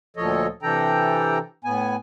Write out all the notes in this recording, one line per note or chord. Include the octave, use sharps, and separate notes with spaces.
D2 A#2 F3 A4 C#5 D#5
C3 E3 D4 A4 G5 A#5
A2 B3 G#5